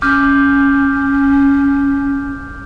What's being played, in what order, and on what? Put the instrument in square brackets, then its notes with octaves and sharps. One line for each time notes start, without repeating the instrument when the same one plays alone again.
[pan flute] C#4 [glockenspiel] D6 F6 G6